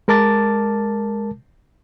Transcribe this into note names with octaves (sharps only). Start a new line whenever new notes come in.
G#3 A#4 A5 D6 A6